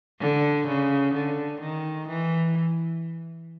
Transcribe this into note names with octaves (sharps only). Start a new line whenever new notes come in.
D3
C#3
D3
D#3
E3